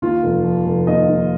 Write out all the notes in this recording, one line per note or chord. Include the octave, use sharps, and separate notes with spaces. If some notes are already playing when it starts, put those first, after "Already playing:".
D#2 F4
F1
F3
F1
D#2 D#5
D#2